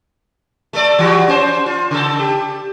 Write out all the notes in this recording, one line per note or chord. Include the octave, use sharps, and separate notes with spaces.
A3 A4 D5
E3 G3 F#4
C#4 C5
F4
C#3 A4
G4